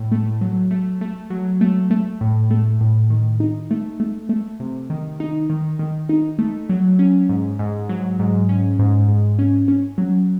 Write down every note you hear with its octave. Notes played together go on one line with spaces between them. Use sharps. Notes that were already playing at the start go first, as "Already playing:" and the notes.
Already playing: A2
A3
F#3
A3
A3
F#3
A3
A3
A2
A3
A2
D#3
D#4
A3
A3
A3
C3
D#3
D#4
D#3
D#3
D#4
A3
F#3
C#4
G#2
G#2
F#3
G#2
C#4
G#2
G#2
C#4
C#4
F#3